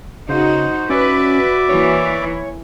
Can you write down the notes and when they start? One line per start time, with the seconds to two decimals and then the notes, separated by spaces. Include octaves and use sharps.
0.29 C#3 D#4 F#4 C5
0.90 C#4 F#4 B4 D5 E5 D6
1.69 E3 A#3 C#5